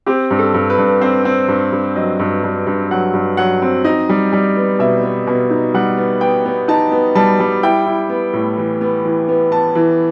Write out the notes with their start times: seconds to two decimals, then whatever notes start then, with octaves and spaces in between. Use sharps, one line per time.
0.06 C4 G4
0.30 G2
0.39 A4
0.54 G2
0.70 B4
0.78 G2
1.01 C4 C5
1.25 C4
1.48 G2
1.72 G2
1.96 F#3 D#5
2.19 G2
2.44 G2
2.67 G2
2.91 F#3 F#5
3.14 G2
3.37 F#3 F#5
3.62 C4
3.84 D#4 D#5
4.09 G3
4.33 G3
4.56 B3
4.79 B2 E5
5.03 B3
5.27 B2
5.50 D#4
5.74 G3 F#5
5.97 B3
6.21 B3 G5
6.45 B3
6.68 D#4 A5
6.92 B3
7.15 G3 A5
7.40 G3
7.63 E4 G5
7.86 E4
8.10 B3
8.33 A2
8.58 E3
8.81 B3
9.04 E3
9.29 B3
9.52 B3 A5
9.75 E3